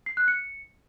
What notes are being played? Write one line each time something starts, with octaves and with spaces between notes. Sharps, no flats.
C7
F#6
C#7